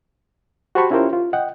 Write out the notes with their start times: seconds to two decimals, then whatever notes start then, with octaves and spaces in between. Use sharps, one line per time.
0.75 F#4 G4 C5 A5 B5 C#6
0.91 C#4 E4 F4 G4 A#4 C5
1.13 F4
1.33 D#5 F#5 G5